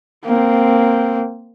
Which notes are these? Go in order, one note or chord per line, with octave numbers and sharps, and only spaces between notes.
A#3 C4